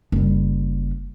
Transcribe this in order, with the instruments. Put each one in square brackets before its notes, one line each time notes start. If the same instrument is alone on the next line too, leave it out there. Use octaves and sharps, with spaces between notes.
[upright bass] F#1 G3